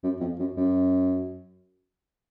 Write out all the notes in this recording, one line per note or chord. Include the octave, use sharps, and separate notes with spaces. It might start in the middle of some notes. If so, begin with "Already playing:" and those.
F#2
F2
F#2
F#2